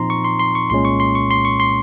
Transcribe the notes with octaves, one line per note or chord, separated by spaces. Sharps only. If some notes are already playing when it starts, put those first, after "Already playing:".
Already playing: A#2 F3 C4 D#4 A#5 C6
C#6
C6
C6
C#6
C2 A#2 G#3 C#4 C6
C#6
C6
C#6
C6
C#6
C6